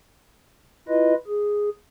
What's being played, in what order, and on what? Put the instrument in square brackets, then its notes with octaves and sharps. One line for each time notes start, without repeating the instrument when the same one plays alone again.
[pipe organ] E4 F4 B4 D#5
G#4